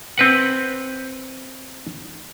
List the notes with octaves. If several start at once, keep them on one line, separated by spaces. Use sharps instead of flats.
C4 B4 F#5